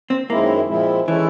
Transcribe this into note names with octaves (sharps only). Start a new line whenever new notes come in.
C4
F#2 D#3 G#3 A#3 C4 E4
A#2 F3 G#3 C4 E4
D#3 E3 G#3 C#4 E4 A4